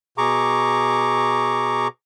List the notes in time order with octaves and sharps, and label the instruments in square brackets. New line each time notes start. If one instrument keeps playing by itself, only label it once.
[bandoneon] B2 G#4 A#5 C#6 D6